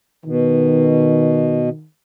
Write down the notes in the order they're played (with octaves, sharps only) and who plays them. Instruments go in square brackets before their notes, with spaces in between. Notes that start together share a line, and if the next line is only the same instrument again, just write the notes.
[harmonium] B2 [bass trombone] D#3